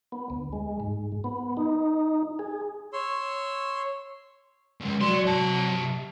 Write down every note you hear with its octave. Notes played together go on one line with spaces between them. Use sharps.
B3
D2
G#3
G#2
B3
D#4
G#4
C#5 C6 E6
C#2 G#3
F#3 D5 C6
C3 A5